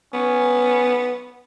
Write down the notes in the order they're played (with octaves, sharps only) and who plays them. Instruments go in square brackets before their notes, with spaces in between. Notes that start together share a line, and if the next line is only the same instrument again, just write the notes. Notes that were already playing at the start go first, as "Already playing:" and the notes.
[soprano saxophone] B3 [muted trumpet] C#4